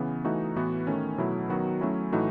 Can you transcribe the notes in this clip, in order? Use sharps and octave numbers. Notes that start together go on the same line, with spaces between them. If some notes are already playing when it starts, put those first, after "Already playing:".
Already playing: C#3 E3 B3
E3 A3 D#4 F#4
A2 E3 B3 F#4
D#3 A3 C#4
B2 F#3 A3 E4
D#3 F#3 B3 F#4
F#3 A3 C#4 E4
A2 E3 A3 D#4 F#4